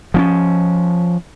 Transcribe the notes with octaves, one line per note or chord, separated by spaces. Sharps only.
F3 C4 C#4